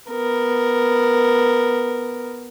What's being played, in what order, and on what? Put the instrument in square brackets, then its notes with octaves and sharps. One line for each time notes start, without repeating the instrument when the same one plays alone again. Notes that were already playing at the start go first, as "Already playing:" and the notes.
[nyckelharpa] B3 A#4